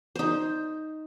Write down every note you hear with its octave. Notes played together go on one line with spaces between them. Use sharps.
D#4 C5